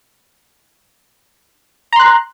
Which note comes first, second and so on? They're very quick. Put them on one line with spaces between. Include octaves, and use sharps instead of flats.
A#5 C6 F#6